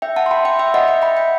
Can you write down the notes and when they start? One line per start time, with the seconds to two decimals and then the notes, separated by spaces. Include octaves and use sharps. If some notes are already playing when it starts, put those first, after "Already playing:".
0.02 E5 G5
0.16 F#5 A5
0.26 C6
0.31 G5 B5
0.45 E5 G5
0.59 E5 G5
0.74 D#5 F#5
0.88 E5 G5
1.02 G5 B5
1.17 G5 B5